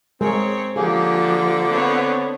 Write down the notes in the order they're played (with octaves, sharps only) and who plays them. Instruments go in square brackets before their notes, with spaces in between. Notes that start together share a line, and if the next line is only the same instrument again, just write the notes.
[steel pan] G#3 G#4 A#4 [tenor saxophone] C4 [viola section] C#5
[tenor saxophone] D3 [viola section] F3 G4 [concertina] A#3 [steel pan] G#4
[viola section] B3 C4 C#5